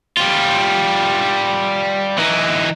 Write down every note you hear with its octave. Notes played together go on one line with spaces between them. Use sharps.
G3 F4
E3 D#4